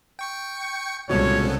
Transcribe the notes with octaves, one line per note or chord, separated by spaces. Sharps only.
G5 C#6 C#7
C2 A#2 C#3 G#3 B3 F#4 A4 C#5